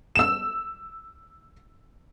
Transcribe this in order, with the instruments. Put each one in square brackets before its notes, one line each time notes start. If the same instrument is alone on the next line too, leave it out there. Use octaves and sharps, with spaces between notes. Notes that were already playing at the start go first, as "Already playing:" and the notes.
[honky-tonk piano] E6 E7